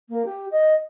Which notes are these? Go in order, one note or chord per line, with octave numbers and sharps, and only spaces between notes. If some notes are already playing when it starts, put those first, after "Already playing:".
A#3
G4
D#5